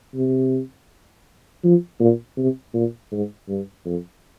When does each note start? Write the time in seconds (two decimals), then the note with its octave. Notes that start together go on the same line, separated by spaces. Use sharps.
0.15 C3
1.64 F3
2.00 A#2
2.37 C3
2.74 A#2
3.12 G#2
3.48 G2
3.85 F2